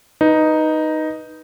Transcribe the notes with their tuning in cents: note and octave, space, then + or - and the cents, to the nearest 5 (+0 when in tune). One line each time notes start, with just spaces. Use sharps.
D#4 +0 B4 -10